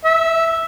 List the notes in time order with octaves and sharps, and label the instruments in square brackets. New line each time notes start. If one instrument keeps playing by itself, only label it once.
[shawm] E5